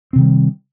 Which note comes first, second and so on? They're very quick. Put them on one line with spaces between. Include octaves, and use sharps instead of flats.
C4 C3 D#3 G3